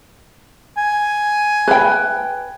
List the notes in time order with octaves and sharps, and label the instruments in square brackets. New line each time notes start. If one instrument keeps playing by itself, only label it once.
[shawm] G#5
[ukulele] B4 G5